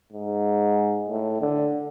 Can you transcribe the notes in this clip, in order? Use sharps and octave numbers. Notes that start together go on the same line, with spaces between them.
G#2
A2
D3